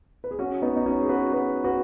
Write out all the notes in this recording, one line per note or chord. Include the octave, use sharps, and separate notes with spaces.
B4
G#4
C#4 F#4
B3 D#4
D#4
C#4 F#4
G#4
F#4 B4
F#4 B4
F#4 B4